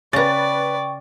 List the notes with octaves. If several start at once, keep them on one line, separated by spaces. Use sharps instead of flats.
C#3 B4 D5 G5 A#5 C#6 A6